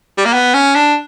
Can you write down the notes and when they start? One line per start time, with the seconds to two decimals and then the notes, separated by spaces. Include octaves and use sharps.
0.18 G3
0.25 A#3
0.33 B3
0.54 C#4
0.75 D4